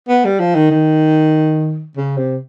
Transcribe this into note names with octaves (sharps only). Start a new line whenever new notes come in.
B3
G3
F3
D#3
D#3
C#3
C3